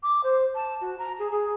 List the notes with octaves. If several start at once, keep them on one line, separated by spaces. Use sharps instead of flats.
D6
C5
A5
F#4
A#5
G#4
G#4